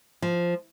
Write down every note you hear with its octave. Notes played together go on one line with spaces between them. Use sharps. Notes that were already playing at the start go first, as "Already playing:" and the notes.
F3